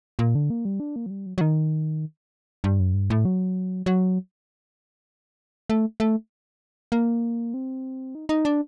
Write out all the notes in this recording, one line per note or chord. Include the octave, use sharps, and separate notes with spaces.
A#2
D3
A#3
G3
D4
A#3
F#3
G3
F#3
F#3
D#3
G2
F#2
G2
A2
F#3
F#3
A3
A3
A#3
C4
D#4
D#4
D4